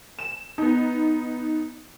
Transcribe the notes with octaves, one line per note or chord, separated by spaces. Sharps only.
E7
B3 D#4